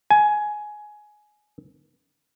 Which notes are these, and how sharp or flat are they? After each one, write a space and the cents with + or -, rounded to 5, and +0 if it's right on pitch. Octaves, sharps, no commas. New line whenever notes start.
G#5 +15